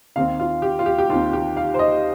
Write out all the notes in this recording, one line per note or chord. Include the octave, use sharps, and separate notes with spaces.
D#2 D#3 C4 F5
F4
G4
F4
G4
G4
D#2 D#3 C4 F4
G4
F5
C5
D#5